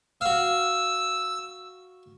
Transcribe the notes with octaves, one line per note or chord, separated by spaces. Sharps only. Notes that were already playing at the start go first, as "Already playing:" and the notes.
F#4 F5 E6